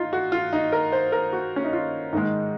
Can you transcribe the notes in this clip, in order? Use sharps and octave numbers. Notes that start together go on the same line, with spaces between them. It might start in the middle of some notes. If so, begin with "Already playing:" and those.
Already playing: D#4 F4
F#4
F4
D#4
A#4
C5
A#4
F#4
C#4
D#4
F4
G#2 D#3 G#3 D#4